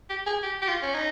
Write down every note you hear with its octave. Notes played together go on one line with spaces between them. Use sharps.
G4
G#4
G4
G4
F4
C#4
D#4